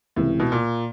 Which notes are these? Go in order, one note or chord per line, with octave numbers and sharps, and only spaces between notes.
C#2 A2 C3 E3
B2
A#2